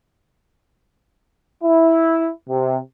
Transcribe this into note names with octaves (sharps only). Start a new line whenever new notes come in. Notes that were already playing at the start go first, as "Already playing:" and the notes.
E4
C3